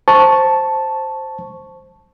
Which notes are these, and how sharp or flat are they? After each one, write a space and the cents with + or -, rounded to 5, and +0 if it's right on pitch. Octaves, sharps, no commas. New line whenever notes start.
C5 +5 A5 +0 C#6 +0